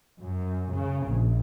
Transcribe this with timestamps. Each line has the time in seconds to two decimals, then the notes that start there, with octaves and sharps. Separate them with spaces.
0.20 F#2
0.72 C#3
1.07 A#1